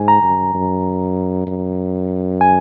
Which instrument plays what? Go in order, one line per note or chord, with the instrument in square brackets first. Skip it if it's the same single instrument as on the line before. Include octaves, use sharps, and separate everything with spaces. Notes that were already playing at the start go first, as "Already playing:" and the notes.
Already playing: [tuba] G#2 [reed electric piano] G#5
[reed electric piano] A#5
[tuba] F#2
F#2
F#2
[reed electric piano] G#5